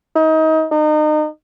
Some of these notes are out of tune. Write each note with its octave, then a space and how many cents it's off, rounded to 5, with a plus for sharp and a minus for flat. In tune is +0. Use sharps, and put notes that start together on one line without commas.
D#4 +30
D#4 -30